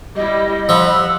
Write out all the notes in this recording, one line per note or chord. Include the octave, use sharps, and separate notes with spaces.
G3 E4 D#5
F3 F#5 B5 E6